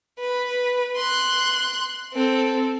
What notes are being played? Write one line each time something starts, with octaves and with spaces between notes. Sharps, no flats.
B4
C6 F#6
C4 A4